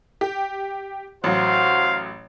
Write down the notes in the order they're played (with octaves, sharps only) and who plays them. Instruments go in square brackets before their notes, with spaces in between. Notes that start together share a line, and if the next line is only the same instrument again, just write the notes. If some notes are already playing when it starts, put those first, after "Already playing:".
[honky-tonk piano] G4
[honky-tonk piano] A1 F#3 [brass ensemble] F#4 C5 F5